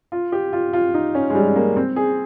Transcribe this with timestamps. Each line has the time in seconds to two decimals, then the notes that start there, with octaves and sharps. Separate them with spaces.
0.12 F4
0.32 G4
0.53 F4
0.73 F4
0.94 D#4
1.15 C#4
1.30 G#3
1.35 G3
1.56 A#3
1.76 C4
1.96 G#4